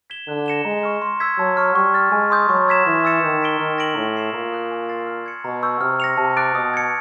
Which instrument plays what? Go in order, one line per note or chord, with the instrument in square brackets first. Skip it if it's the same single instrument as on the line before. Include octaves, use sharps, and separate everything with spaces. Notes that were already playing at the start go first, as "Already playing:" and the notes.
[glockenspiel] G#6 B6 E7 G7
[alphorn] D3 [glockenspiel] F#6
[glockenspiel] A#6 C#7 E7 G7
[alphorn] G#3 [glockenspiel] A#5
[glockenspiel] C#6 F6
C6
E6 G#6 B6
[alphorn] F#3 [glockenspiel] A5
[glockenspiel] C#6 F6
[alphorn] G3 [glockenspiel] C#6
[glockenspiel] F6 A6
[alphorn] G#3 [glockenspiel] G#5
[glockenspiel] C6 D#6 G6
[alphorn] F#3 [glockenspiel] C#6
[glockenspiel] E6 G#6 B6 E7
[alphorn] E3 [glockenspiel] C#6
[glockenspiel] E6 A6 C#7 E7
[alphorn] D#3 [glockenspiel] G6
[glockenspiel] B6 D7 G7
[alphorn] D#3 [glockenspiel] F6
[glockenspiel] A#6 D7 F#7
[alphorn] A2 [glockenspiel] C6
[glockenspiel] E6 G#6 C7 E7
[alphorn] A#2 [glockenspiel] A#5
[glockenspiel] D#6 F#6
G#5
C6 E6 A6 C7
F6
G#6 C#7
[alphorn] B2 [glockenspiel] A#5
[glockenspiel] C#6 E6 G6
[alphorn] C3 [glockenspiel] F6
[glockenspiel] A#6 C#7 F7
[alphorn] C3 [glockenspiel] A5
[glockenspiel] D6 F#6 A6 D7
[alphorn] B2 [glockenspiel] D#6
[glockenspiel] G#6 C#7